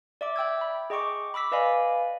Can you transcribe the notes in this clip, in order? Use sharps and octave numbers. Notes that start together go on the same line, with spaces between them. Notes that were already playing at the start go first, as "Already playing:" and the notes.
D5 E5 D6
E5 G5 E6 G#6
B5
G#4 D#5 G5 C#6 D6
B5 D6 E6 B6
B4 D5 D#5 F5 G#5 B5